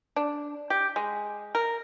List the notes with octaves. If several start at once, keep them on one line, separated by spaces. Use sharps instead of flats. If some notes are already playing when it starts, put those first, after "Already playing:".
D4
G4
G#3
A#4